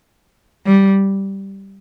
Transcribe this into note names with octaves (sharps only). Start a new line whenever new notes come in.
G3